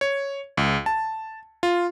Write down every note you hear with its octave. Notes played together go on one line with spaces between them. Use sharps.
C#5
C#2
A5
F4